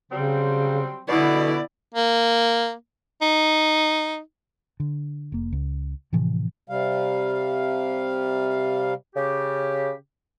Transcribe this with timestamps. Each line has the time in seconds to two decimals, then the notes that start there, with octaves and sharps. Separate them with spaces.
0.12 C#3 F#3 G3 C4
1.09 B2 D3 E4 D5
1.95 A#3
3.22 D#4
4.80 D3
5.32 F1 A#3
5.52 C#2
6.13 A2 C3 E3 F3
6.70 C3 G3 F5
9.15 C#3 G4